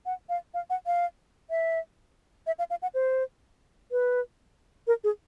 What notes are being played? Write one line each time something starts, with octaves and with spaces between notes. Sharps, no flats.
F#5
F5
F5
F#5
F5
E5
E5
F5
F5
F#5
C5
B4
A#4
G#4